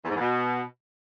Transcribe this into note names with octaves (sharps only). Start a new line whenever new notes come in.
E2
G#2
E2
B2